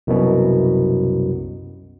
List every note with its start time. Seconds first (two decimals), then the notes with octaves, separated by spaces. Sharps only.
0.07 C2 F#2 B2